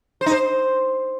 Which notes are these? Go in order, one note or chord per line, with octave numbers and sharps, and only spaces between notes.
C5
D#4
C5